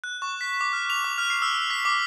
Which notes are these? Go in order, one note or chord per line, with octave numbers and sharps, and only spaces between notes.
F#6
C#6
B6
D6
F6
F7
D6
F6
C7
E6
B6
D6